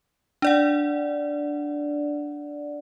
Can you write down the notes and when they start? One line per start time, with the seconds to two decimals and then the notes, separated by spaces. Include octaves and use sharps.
0.42 D4 D5 F#5